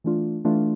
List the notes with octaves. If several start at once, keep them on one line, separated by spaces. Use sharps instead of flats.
E3 A3 D4 F4
E3 A3 D4 F4